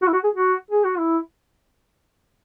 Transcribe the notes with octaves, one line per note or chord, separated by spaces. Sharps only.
F#4
E4
F#4
G#4
F#4
G#4
F#4
E4